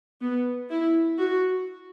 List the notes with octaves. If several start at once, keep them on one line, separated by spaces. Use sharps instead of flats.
B3
E4
F#4